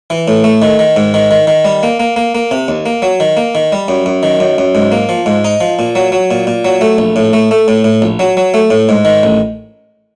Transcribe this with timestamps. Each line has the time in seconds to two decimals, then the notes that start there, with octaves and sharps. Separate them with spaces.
0.10 E3
0.28 A2
0.44 A3
0.62 D#3
0.79 D#3
0.96 G#2
1.14 D#3
1.31 D#3
1.47 D#3
1.65 G3
1.83 A#3
2.00 A#3
2.16 A#3
2.35 A#3
2.51 C3
2.68 D#2
2.86 A#3
3.02 F#3
3.20 D#3
3.37 A#3
3.55 D#3
3.72 G3
3.88 F#2
4.06 F#2
4.23 D#3
4.40 F#2
4.58 F#2
4.75 G#2
4.92 A#3
5.09 F3
5.26 G#2
5.44 D#4
5.61 F3
5.79 A#2
5.95 F#3
6.12 F#3
6.31 A#2
6.47 A#2
6.65 F#3
6.81 A3
6.98 A#1
7.16 A2
7.33 A3
7.51 A3
7.68 A2
7.84 A2
8.02 A#1
8.19 F#3
8.37 F#3
8.54 A3
8.70 A2
8.89 G#2
9.05 D#3
9.23 A1